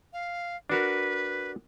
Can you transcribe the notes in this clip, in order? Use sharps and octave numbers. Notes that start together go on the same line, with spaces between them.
F5
D4 F#4 A#4 B4